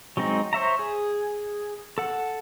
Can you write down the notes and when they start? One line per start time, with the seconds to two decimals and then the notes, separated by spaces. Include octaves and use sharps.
0.17 F#3 G#3 C4 D#4
0.53 C5 C#5 E5 A#5
0.79 G#4
1.98 A4 F#5